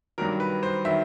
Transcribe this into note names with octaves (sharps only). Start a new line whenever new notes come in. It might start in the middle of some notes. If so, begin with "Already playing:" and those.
G2 D#3 F#3 A#4
B4
C5
D#3 F#3 E5